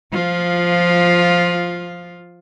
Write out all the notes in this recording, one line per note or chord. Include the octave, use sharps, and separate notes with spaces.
F3 F4